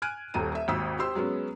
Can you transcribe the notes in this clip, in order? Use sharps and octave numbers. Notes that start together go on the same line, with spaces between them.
G#5 F6 F#6 G#6 D7 D#7
D#1 D#2 A4 A#5 D#7
E5
G#1 D#2 D#6 E6 B6
G4 C5 C6 E6
F#3 G#3 B3 C#4